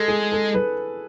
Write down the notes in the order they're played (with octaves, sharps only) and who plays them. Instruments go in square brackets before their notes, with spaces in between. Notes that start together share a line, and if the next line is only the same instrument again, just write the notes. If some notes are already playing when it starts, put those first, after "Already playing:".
Already playing: [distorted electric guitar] G#3 [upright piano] A4
[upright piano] G#4
A4
B4